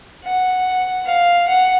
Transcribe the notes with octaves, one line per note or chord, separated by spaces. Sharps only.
F#5
F5
F#5